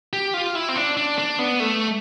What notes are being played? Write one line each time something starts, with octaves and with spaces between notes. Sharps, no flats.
G4
F4
E4
C4
D4
D4
D4
B3
A3